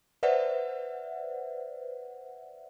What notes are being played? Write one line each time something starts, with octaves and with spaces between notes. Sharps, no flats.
B4 C5 D5 E5 F#5